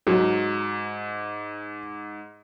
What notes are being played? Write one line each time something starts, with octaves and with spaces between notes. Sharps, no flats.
G#2 F#3